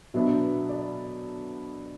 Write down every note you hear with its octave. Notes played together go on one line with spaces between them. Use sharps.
B2 F#3 B3 D4 E5
D5